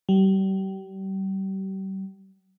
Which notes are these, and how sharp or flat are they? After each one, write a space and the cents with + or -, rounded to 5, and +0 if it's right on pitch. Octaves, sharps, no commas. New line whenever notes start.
G3 -35